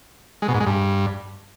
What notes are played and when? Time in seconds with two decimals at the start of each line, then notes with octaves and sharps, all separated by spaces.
0.42 G#3
0.48 B2
0.54 G#2
0.60 G#3
0.66 G2